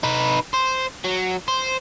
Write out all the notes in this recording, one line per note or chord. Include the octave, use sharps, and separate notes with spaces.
D#4 B4
C5
F#3
C5